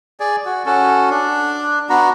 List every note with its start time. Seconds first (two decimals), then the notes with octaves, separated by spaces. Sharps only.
0.20 G#4 D5
0.45 F#4
0.66 C#4 F#4 A4
1.10 D4
1.90 B3 D4 F#4 A#5